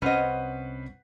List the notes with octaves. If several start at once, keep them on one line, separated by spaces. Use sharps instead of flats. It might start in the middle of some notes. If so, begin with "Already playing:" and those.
C2 C#4 B4 C5 D#5 F#5